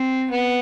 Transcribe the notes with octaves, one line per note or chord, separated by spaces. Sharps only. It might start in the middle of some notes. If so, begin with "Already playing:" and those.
Already playing: C4
B3